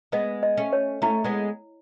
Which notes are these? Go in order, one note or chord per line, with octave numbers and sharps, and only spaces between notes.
G#3 B3 D#5
D#5
A3 C#4
C#5
A3 C#4 E4
G#3 B3